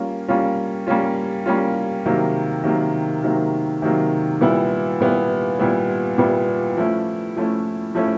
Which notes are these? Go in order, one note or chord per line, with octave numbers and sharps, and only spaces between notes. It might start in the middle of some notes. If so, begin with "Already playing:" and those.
Already playing: G3 A#3 C#4 F4
G3 A#3 C#4 F4
G3 A#3 C#4 F4
G3 A#3 C#4 F4
C3 D#3 F#3 A#3
C3 D#3 F#3 A#3
C3 D#3 F#3 A#3
C3 D#3 F#3 A#3
A#2 G3 B3 E4
A#2 G3 B3 E4
A#2 G3 B3 E4
A#2 G3 B3 E4
F3 A3 C#4 E4
F3 A3 C#4 E4
F3 A3 C#4 E4